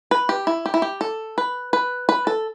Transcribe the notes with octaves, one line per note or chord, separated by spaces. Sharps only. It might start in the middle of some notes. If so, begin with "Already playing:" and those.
B4
G4
E4
G4
E4
G4
A4
B4
B4
B4
A4